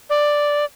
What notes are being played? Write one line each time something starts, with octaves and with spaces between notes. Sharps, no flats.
D5